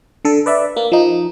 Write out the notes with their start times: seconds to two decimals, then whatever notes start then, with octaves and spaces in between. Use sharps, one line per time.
0.25 D3 A4
0.46 B4 D5 E5
0.77 A#3
0.92 F3 D#4